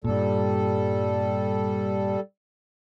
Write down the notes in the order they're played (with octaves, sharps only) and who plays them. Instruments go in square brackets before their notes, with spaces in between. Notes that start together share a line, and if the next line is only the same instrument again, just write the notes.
[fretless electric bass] G2 A#2 [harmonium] G3 A4